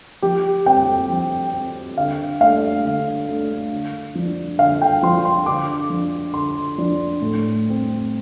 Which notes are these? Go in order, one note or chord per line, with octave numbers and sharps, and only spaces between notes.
F3 G4
C4 G5
F3
C4
D3 F5
A3 D4 F5
D3
A3 D4
D3
F3 D4
D3 F5
G5
F3 D4 C6
C6
D3 D6
F3 D4
D3 C6
F3 D4
A2
A3 C4